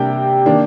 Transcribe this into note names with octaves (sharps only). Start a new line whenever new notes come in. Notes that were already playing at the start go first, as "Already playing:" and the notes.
Already playing: C3 G3 A#3 D4 G5
D#3 A#3 D4